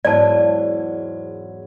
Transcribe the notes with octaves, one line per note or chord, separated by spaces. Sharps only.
E2 G#2 F#3 D5 A5